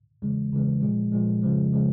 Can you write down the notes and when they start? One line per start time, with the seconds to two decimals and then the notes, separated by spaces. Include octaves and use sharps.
0.22 E2 C#3 E3 G#3
0.52 E2 C#3 E3 G#3
0.81 A#2 F3 G#3
1.12 A#2 F3 G#3
1.41 F2 C#3 F3 G#3
1.73 C#3 F3 G#3